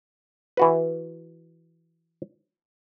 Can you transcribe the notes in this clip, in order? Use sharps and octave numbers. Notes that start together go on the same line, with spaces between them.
E3 F#4 B4